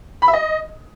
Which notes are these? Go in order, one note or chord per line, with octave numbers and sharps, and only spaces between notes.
B5
E5
D#5